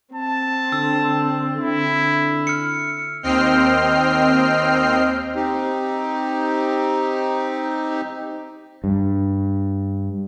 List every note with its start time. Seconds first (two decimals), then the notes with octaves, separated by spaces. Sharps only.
0.15 C4 A5
0.72 D3 E6
1.59 D3 E4
2.47 F6 C#7
3.23 D#2 C4 D#5 G5 F6 C7
5.36 C4 D#4 G4
8.84 G2